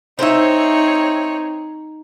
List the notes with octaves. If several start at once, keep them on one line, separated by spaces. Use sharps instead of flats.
C4 D#4 C5 C#5 E5